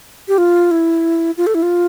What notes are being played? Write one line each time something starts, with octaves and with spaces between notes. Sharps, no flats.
G4
F4
E4
F4
A4
E4
F4